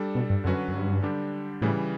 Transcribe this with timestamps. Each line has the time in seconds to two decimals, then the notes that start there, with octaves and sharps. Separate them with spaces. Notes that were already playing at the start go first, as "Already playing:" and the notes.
Already playing: G3 D4 A4
0.15 B2
0.30 G2
0.44 F#2 D3 F#3 C#4 F#4 B4
0.68 F#2
0.73 G2
1.02 D3 G3 D4 G4
1.62 A2 C#3 E3 G3